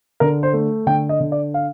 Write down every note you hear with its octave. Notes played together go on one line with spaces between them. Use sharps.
D3 A#4
C5
A3
D3 G5
D#5
D3
D5
F5